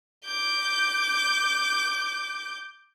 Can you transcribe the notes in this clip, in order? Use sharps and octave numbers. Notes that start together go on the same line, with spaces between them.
D6 G6